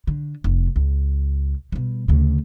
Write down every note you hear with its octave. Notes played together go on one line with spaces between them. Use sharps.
D3
F1
C#2
B2 G3
D2 C#3